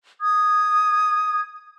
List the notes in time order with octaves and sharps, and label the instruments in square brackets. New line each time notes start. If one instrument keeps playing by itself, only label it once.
[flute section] D#6 G#6